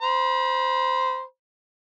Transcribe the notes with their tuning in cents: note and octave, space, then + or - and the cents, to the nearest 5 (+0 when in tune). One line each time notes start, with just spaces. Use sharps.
C5 -10 B5 -45